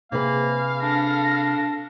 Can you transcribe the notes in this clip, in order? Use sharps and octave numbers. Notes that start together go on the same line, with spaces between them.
C3 A#3 G#4 B4 F5
D4 A4 A#6